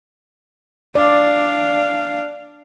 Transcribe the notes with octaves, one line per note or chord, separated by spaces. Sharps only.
D4 D5 F5